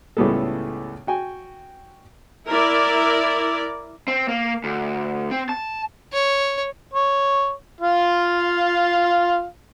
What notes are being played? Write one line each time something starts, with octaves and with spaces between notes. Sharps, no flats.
C#2 A2 G3 B3 G#4 A4
F#4 G5 G#5
E4 A#4 D5
C4
A#3
D2
C4
A5
C#5
C#5
F4 F5